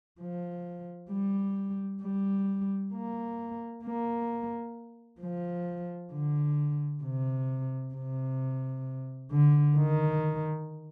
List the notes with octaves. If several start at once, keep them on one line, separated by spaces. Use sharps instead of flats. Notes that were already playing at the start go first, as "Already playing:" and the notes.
F3
G3
G3
A#3
A#3
F3
D3
C3
C3
D3
D#3